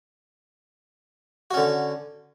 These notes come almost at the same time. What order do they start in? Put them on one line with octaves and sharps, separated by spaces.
F#4 C#4 D3